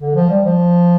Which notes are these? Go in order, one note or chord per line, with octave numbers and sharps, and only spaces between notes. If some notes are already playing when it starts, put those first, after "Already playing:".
D3
F3
G3
F3